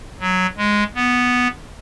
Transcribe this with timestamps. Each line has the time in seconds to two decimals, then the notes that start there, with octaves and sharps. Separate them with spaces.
0.20 F#3
0.57 G#3
0.95 B3